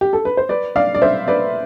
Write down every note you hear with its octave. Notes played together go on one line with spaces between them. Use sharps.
G4
A4
B4
C5
B4 D5
D5 F5
D5
C5 E5
B4 D5